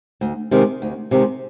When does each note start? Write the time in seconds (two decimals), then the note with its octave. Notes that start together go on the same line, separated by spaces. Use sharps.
0.21 D2
0.51 C3 D#3 G#3
0.82 D2
1.11 C3 D#3 G#3